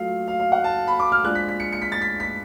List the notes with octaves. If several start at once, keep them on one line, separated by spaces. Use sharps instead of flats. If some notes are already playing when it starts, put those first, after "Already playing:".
Already playing: F#3 A3 F4 F5
F5
F5
F#5
A5
B5
D6
F6
F3 G#3 D4 F#6
B6
B6
C#7
C#7
B6
A6
B6
B6